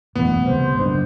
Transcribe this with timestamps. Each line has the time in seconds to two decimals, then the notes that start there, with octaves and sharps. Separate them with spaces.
0.15 E1 A1 F#2 B3
0.46 C#2 C3 G3 C5
0.77 F#1 D#3 D4